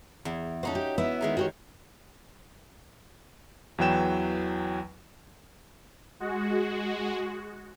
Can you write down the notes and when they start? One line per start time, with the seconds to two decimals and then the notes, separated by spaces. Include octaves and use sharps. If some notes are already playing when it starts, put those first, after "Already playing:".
0.25 E2
0.63 C#4 D#4 F#4 A4 C5
0.75 G4
0.98 B3 E4 E5
1.21 D#3 G#3 D#4
1.37 F#4 G4 C#5
3.78 E2 E3 F#3 B4 G5 E7
6.20 G#3 F#4